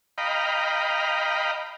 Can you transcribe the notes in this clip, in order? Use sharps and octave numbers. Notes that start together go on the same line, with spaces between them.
D#5 F5 G5 A#5 B5